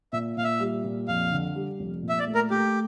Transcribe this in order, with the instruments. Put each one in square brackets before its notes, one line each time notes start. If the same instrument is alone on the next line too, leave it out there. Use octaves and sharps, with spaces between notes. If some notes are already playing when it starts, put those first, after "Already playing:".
[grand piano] A#2 [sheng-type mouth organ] E5
[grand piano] A#2 [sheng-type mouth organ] F5
[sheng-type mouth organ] E5
[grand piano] G3
A#2
[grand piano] F2 [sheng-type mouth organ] F5
[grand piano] D3
G3
F1
A#2
[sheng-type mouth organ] E5
D5
[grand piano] A3
[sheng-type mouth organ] A#4
[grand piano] A3 [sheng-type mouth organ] G4